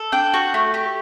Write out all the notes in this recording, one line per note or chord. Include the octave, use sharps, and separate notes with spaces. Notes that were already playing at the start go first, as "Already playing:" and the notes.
Already playing: A4
D4 G5
F#4
A3
G4